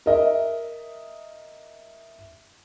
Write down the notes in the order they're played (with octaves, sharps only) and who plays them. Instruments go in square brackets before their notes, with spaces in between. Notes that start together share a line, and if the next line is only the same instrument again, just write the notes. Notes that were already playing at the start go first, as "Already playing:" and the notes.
[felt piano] A#4 D#5 E5